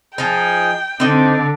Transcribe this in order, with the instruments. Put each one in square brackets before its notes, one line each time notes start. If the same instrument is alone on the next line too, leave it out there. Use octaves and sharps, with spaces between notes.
[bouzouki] F3 D#4 [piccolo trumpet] G#4 [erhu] G5
[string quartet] D3 [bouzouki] C4 D#4 D#5 [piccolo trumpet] D5